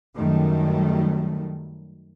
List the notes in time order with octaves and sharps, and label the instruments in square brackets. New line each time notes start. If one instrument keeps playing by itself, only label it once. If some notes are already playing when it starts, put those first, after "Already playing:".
[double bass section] F#2 D#3 F#3 G3 A3